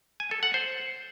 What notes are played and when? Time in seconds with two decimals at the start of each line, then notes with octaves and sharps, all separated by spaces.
0.20 G#5
0.31 A4
0.43 F#5
0.54 C5